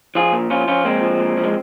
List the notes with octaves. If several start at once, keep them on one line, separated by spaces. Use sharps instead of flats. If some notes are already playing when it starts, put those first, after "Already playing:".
F3 F4 G#4
A#2
F3 C#4 F4
F3 C#4 F4
A#2 G#3 C4
F3
A#2
F3
G#3